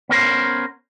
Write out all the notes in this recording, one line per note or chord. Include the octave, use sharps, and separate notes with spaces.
B3 C#4 A#4 C5